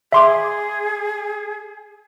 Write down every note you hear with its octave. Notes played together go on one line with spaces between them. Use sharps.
G#4 E5 C6 D6